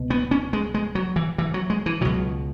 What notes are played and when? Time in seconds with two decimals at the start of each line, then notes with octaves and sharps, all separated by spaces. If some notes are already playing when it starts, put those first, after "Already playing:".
Already playing: C#2 B2
0.10 B3
0.31 C#4
0.53 G#3
0.74 G#3
0.95 F#3
1.16 E3
1.38 E3
1.54 F#3
1.70 G#3
1.86 E3
2.01 C#2 B2 F#3